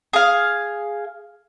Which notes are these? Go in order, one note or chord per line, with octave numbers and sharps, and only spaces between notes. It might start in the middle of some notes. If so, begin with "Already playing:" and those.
G#4 F5